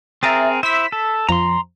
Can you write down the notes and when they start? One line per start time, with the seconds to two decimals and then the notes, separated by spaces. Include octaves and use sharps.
0.23 C4 G#4 A#4 E5 A#5 A6
0.63 E4 C5 E5 B6 E7
0.92 A4
1.29 F2 F3 A#5 C6